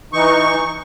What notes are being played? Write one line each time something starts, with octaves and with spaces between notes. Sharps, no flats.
E3 D#4 C#6